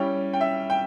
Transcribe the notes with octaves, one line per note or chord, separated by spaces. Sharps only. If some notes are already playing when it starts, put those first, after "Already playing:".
Already playing: G3 C#4 E4 G5
G5
E5
G5